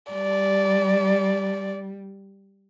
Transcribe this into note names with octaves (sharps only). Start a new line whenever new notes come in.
G3 D5